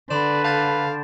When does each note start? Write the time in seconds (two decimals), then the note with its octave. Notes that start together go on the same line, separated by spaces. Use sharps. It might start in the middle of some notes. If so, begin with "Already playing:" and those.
0.10 D3 B4 D5 B5 C6 E7
0.44 F5 A5 G6 A6